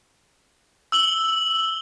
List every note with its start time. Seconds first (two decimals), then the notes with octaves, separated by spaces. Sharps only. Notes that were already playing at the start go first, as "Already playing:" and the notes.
0.92 E6 F#7 G7